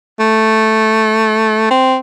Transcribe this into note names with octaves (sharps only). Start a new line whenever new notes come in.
A3
C4